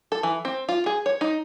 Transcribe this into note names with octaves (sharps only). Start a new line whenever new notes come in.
A4
E3
C4
F4
G#4
C#5
D#4